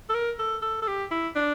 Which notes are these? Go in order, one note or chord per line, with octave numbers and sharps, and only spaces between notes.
A4
A#4
A4
A4
A4
G4
E4
D4